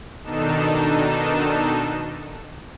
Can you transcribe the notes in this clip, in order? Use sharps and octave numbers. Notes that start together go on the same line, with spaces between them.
B2 D#3 D4 D#4 A4 E7